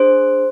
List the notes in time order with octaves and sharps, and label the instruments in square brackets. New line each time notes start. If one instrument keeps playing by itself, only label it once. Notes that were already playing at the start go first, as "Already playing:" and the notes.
Already playing: [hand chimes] D4 G#4 C5